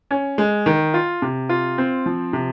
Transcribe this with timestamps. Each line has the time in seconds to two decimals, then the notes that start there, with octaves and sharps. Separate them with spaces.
0.11 C#4
0.38 G#3
0.66 D#3
0.94 F4
1.22 C3
1.49 F4
1.78 C4
2.06 F3
2.33 C3